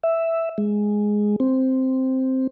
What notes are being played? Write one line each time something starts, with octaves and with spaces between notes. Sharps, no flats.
E5
G#3
C4